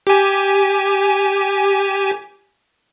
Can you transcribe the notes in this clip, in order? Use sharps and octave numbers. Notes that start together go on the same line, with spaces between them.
G4 G#5